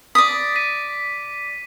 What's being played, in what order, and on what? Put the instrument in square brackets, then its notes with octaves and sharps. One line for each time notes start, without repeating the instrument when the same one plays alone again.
[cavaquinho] D5 D#6 [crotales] B6
[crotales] B6 D#7